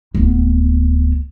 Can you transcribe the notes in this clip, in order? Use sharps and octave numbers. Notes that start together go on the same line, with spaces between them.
D1 B3